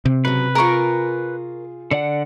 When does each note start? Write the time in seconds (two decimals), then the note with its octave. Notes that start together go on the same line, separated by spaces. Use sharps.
0.05 C3
0.25 C#3 F#3 B4
0.55 F4 G#4 A#4 C#6
1.91 D3 D5 F#5